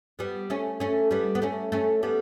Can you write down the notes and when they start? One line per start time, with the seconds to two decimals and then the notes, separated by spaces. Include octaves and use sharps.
0.19 G3 B3
0.50 A3 C#4
0.80 A3 C#4
1.11 G3 B3
1.35 B3
1.42 A3 C#4
1.72 A3 C#4
2.03 G3 B3